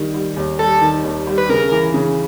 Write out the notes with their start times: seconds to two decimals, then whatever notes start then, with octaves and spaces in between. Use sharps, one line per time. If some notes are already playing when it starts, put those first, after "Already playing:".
Already playing: D#3 G3
0.14 G3
0.37 D#2
0.59 G3 A4
0.81 D#3
1.04 D#2
1.27 G3
1.38 B4
1.49 C#3 A#4
1.72 E3
1.94 C#3